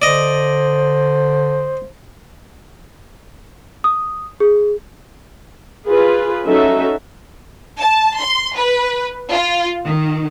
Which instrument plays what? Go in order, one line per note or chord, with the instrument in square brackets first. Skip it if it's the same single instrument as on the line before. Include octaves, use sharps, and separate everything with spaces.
[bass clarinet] D3 [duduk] C5 [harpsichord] D5 D#5
[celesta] D#6
G#4
[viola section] F4 G#4 B4
F#3 C#4 D#4 A4 E5
[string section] A5
C6
B4
F4
D#3